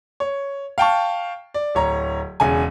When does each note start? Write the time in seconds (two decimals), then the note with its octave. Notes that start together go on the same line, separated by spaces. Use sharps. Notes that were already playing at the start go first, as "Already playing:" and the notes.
0.20 C#5
0.78 F5 G5 A5 C#6
1.54 D5
1.75 D1 C#5 A#5
2.40 E1 C#3 G#5